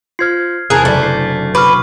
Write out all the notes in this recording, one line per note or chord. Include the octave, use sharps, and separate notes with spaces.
F4 C5 F6 G#6 C7
E2 C3 G#4 A#4 A5 F#6
F#1 A3 C5 D5
D4 C7
B2 B4 C#6 D6 F6